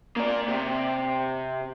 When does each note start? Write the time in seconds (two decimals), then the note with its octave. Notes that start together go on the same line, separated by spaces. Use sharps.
0.16 A#3 D5
0.48 C3